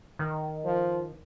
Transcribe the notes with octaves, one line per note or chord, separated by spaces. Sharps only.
D#3
F3